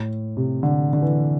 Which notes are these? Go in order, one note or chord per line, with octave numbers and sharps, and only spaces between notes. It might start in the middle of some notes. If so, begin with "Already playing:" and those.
Already playing: A2
C3
D3
D3
E3